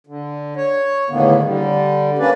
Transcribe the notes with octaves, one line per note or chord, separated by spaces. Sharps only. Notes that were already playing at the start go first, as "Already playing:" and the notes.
D3
C#5
E2 A2 D3 D#3 A#3 B3
D3 G3
A#3 C#4 D4 B4 D5